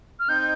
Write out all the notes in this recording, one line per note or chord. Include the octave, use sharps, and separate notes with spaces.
F6
C4 D#4 G6